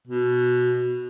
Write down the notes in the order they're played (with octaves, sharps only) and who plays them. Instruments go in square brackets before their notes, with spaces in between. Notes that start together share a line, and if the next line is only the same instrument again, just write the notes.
[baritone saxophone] B2